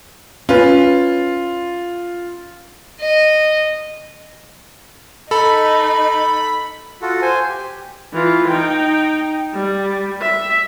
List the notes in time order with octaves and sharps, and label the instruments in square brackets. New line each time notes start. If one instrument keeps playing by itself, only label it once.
[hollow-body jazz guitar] C#4 B4 [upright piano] F4
[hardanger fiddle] D#5
[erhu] D#4 [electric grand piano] A4 [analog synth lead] B5
[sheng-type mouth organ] F4 F#4 A4
C5 G#5
G4
[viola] E3 F4
D#4 G5
G3
E5